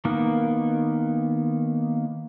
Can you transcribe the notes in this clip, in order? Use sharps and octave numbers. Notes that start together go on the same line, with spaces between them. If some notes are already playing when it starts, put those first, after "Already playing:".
D#3 A#3 B3